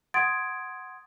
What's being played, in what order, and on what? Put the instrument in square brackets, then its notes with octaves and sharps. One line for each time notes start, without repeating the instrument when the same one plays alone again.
[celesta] F#5 C6 D#6 G#6 A6 D7